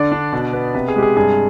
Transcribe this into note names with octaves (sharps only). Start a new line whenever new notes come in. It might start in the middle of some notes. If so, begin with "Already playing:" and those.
Already playing: D3 D5
D4
B2
B3
C3 B4
G#4
G#3 G4
G#4
G2 G#4